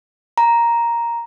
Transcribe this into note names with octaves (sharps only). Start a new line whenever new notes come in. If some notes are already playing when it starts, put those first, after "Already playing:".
A#5